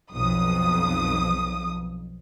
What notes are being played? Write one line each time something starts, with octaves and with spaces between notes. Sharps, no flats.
B1 F2 D#6